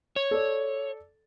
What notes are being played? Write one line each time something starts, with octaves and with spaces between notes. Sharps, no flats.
C#5
A4 D5